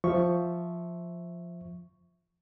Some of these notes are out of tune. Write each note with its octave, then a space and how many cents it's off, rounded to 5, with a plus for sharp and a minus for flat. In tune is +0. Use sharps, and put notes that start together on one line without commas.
F3 +0 E5 +0 C#6 +0